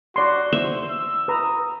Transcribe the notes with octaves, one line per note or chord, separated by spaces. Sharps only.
F#4 D5 C6
C5 E5
E6
B4 A#5 D#6